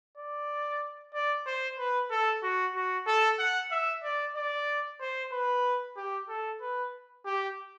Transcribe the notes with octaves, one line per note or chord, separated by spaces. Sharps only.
D5
D5
C5
B4
A4
F#4
F#4
A4
F#5
E5
D5
D5
C5
B4
G4
A4
B4
G4